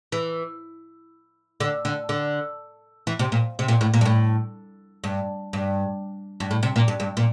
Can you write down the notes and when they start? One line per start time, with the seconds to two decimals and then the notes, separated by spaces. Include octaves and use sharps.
0.12 E3
1.60 D3
1.85 D3
2.09 D3
3.07 E3
3.19 C3
3.32 A#2
3.59 C3
3.68 A#2
3.81 A2
3.94 A#2
4.01 G2
4.06 A2
5.04 G2
5.53 G2
6.40 G2
6.51 A2
6.63 C3
6.76 A#2
6.88 G2
7.00 G2
7.17 A#2